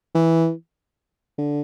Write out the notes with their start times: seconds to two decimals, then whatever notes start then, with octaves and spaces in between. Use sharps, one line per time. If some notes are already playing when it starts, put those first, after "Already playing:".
0.15 E3
1.38 D3